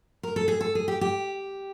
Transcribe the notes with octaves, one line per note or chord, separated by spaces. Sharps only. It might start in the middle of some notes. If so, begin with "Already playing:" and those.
A#4
A4
G#4
A4
G#4
G4
G4